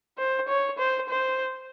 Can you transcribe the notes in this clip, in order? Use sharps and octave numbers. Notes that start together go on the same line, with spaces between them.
C5
C#5
C5
C5